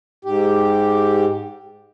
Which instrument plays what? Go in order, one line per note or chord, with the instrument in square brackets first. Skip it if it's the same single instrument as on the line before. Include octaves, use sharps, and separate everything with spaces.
[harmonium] G#2 G4